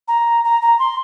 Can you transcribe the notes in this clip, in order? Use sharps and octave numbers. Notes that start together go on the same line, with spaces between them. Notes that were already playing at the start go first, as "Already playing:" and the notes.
A#5
A#5
A#5
C6